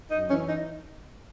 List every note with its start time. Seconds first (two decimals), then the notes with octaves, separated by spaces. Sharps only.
0.11 F#2 D#4
0.30 E3 C#4
0.48 D#4